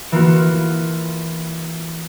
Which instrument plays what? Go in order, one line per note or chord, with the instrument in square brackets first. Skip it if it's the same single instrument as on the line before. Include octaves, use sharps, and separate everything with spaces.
[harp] E3 A#3 F4 F#4